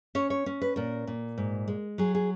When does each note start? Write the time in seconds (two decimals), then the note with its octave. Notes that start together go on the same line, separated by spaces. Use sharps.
0.15 C#4 C#5
0.30 C#5
0.46 C#4
0.62 B4
0.76 A#2 A#4
1.07 A#2
1.38 G#2
1.68 G#3
1.98 F#3 G#4
2.15 G#4